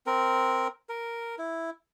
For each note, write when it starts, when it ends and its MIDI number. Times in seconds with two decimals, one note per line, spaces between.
0.07 0.68 60
0.07 0.68 70
0.89 1.35 70
1.38 1.70 64